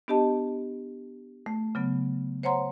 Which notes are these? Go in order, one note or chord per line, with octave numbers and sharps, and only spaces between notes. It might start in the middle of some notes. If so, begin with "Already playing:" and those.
B3 D4 G4 D#5 A5
A3
C#3 F#3 B3
C5 C#5 F#5 A#5 C6